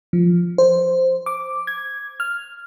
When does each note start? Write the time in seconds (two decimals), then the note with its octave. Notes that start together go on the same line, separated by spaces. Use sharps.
0.13 F3
0.58 C5
1.26 D6
1.67 G#6
2.20 F6